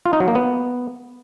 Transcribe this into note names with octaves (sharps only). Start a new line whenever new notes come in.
F4
D#4
F#3
A#3
B3